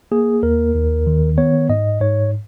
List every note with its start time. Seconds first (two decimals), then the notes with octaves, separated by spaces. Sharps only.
0.12 A#3 G#4
0.43 D#2 A#4
0.75 D#2
1.07 D#3
1.38 B3 C#5
1.69 G#2 D#5
2.01 G#2 C#5